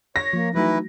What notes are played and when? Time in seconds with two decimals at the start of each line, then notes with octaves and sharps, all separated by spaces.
0.16 C#5 A#6
0.33 F3 A#3
0.55 E3 F#3 A3 D#4 E4 F#4 B4